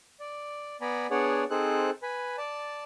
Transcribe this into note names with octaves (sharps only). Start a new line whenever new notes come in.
D5
B3 D5 G#5 A#5 B5
B3 D4 G#4 C#5 D5 F#5
C4 D#4 G#4 A4 C5 F#6
B4 G#5 B5
D5 A5